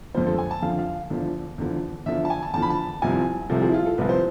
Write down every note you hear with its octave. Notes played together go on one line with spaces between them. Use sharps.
F2 D3 F3 C5
A4
G#5
A5
F2 D3 F3 F5
F5
E2 D3 F3
E2 D3 F3
E2 D3 F3 E5
A5
G#5
A5
E2 D3 F3 A5
B5
A5
C2 C3 F3 G#5
C2 C3 F3 A4
G#4
E4
F4
A4
C2 C3 F3 B4
C5